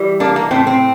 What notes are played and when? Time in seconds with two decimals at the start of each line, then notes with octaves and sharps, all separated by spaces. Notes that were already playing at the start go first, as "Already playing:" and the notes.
Already playing: E3 G3
0.20 A#3 D4
0.36 A#3
0.51 A2 C4
0.67 C4